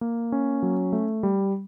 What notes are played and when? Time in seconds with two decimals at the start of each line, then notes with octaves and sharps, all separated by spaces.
0.01 A#3
0.32 C#4
0.63 F#3
0.93 A3
1.23 G3